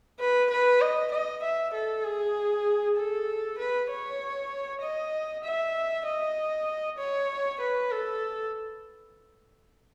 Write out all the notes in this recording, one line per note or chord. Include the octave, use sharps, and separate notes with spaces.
B4
B4
D#5
D#5
E5
A4
G#4
A4
B4
C#5
D#5
E5
D#5
C#5
B4
A4